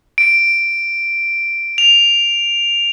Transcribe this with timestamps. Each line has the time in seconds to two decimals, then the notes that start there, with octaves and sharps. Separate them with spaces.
0.18 D7
1.78 F7